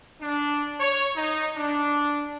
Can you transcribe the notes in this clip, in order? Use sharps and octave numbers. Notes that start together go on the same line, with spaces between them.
D4
C#5
D#4
D4